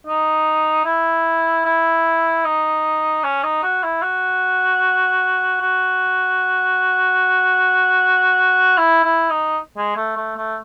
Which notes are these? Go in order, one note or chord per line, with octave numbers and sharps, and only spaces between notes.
D#4
E4
E4
D#4
C#4
D#4
F#4
E4
F#4
F#4
E4
E4
D#4
G#3
A3
A3
A3